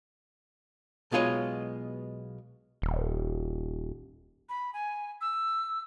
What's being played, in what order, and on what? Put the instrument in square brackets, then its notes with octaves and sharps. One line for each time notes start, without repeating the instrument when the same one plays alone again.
[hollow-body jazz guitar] B1 B2 G#3 F4 C#5 D#5
[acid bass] D#1
[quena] B5
G#5
E6